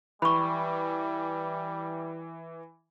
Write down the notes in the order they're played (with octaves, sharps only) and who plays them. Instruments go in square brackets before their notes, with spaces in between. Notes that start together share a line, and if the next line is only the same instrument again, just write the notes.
[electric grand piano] E3 [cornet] G3 [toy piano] B5 C#6